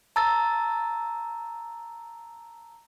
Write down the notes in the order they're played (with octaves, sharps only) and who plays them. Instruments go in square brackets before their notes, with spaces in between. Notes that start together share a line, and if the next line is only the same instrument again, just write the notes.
[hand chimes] A5 A#5 E6 A6